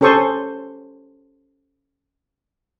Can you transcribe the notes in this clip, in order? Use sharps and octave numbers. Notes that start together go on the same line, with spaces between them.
C#4 G4 A4 C5 C#6 D#6